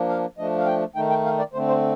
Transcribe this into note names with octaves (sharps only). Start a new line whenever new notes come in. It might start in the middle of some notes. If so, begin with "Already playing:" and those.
Already playing: F3 A#3 D4
F5
F3 A3 D4 D#5
F5
G5
D#3 A3 D#4 G5
G5
F5
D5
D3 A3 C4 C5
C5